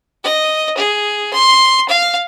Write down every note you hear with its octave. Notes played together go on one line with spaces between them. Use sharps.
D#5
G#4
C6
F5